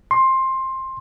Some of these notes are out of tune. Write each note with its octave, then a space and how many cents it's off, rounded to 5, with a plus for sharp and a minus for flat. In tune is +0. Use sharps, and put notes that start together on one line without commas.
C6 +15